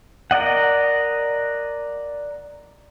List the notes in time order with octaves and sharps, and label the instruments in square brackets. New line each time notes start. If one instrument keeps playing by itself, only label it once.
[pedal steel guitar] A#4 D5 D#5 F#5